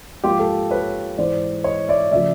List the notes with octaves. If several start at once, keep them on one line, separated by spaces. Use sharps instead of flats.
G#2 F3 A#3 F4 G4
G4 A4
B4 C#5
G#2 E3 G#3 C5 D5
C#5 D#5
D5 E5
C#3 F3 A3 D5 E5